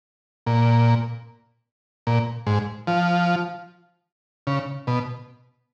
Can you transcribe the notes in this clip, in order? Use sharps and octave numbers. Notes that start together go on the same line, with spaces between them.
A#2
A#2
G#2
F3
C#3
B2